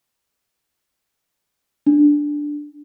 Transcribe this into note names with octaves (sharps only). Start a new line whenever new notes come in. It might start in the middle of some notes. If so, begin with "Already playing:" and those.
D4